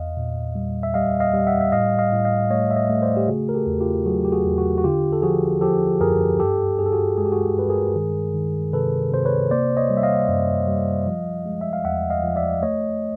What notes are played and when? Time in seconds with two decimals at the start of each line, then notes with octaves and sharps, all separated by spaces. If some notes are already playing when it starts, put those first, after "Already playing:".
Already playing: E2 D#5 F5
0.17 A#2
0.55 G3
0.83 E5
0.94 G3 D#5 F5
1.20 D#5 F5
1.33 G3
1.47 E5 F#5
1.61 E5
1.72 A2 D#5 F5
1.99 D#5 F5
2.12 A2
2.25 D#5 F5
2.50 A3 C#5 D#5
2.71 E5
2.76 C#5 D#5
2.89 A3
3.02 C5 D5
3.17 G4
3.28 C#3 F#4 G#4
3.49 A#4
3.54 G4 A4
3.67 E2
3.80 F4 G4
4.06 F#3 F#4 G#4
4.25 G4
4.32 F#4 G#4
4.45 E2
4.58 F#4
4.78 F#4
4.84 D3 F4 G4
5.12 A4
5.22 F3 F#4 G#4
5.61 F3 G4 A4
6.01 F#2 G#4 A#4
6.39 G2 G4 A4
6.79 G2 G#4
6.86 A4
6.92 F#4 G#4
7.18 G#3 G#4
7.25 G4
7.32 F#4 G#4
7.56 G2 B4
7.69 G#4 A#4
7.96 D#3
8.34 D#3
8.73 C3 A4 B4
9.12 C3 C5
9.25 B4 C#5
9.51 A#3 C5 D5
9.77 C#5 D#5
9.90 G3
9.97 E5
10.03 D#5 F5
10.28 F#2
10.68 G3
11.07 F3
11.46 G#3
11.61 E5
11.73 F5
11.85 E2 E5 F#5
12.10 D#5 F5
12.24 F3
12.36 D5 E5
12.63 A3 C#5 D#5